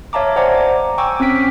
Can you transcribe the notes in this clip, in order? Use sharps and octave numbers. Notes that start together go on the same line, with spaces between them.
C#5 E5 F5 A5 A#5 D6
C5 D5 F#5 G#5 A#5 D6
G5 G#5 C#6 D6 E6
C4 C#4 G5 B6 D7